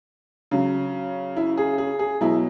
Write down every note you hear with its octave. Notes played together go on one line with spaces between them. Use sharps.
C#3 F#3
E4
G#4
G#4
G#4
B2 F#3 E4